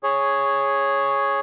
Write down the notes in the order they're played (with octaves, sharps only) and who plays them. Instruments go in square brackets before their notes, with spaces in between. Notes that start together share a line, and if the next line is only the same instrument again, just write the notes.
[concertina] G#4 C#5